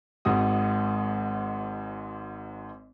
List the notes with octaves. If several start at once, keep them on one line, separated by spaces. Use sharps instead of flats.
G#1 G#2 F#4 D#6